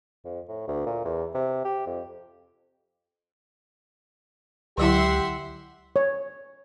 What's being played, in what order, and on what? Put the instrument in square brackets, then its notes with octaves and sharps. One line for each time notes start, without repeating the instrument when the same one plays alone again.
[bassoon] F2
A2
D2
A#2
E2
C3
G4
F2
[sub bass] C#2 [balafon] D3 F#3 E4 [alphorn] G4 [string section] E5 F#5 C6
[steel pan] C#5